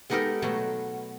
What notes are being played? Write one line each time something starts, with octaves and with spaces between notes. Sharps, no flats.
G#3 B3 D#4 G4 A4 A#4
B2 F#3 A3 B3